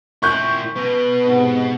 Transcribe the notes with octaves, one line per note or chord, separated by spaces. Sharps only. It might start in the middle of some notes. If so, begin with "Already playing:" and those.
A#2 E4 C#6 G6
B2 B4
G#2 C3 B3